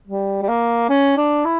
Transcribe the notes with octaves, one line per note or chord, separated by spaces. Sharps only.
G3
G3
A#3
C#4
D4
E4